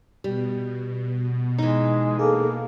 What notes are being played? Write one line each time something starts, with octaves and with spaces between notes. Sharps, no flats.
B2 G3
E3 G#3 D#4
A#3 G#4 A4